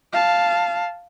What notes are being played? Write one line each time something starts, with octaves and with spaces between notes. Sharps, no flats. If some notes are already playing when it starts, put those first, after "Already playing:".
F5 A5